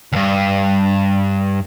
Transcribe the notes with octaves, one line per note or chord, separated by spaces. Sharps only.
D2 G2